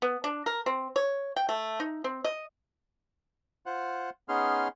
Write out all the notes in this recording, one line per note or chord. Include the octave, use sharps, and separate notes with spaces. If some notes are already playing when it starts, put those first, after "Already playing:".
B3
D4
A#4
C4
C#5
G5
A3
D#4
C4
D#5
F4 C5 F#5
B3 C#4 D#4 G#4 C6 F6